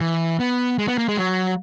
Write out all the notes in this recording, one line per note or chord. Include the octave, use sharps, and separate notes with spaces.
E3
B3
G#3
B3
A#3
G#3
F#3